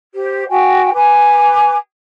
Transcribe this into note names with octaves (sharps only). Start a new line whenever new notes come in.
G4 C5
F#4 G5 G#5
B4 G#5 D6